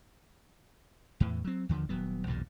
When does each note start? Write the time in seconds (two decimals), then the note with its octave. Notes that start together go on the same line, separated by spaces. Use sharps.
1.20 E2 A2 E3
1.45 F#3 C4
1.69 D#2 D3 D#3 F3
1.89 D#1 F#3 B3
2.27 B1 E2 G2 A#2